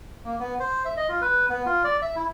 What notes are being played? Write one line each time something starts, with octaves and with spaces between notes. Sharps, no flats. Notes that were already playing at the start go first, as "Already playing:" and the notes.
A#3
B3
C5
E5
D#5
F4
B4
B3
F4
D5
E5
E4